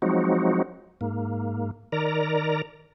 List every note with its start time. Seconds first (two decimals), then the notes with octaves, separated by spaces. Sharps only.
0.02 F3 F#3 G#3 C4 D#4 F#4
1.01 G#2 A#3
1.92 D#3 A#4 D5 A#5